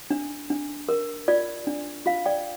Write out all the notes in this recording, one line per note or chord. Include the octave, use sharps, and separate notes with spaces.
D4
D4
A#4
F4 D5
D4
F4 F5
D5 G5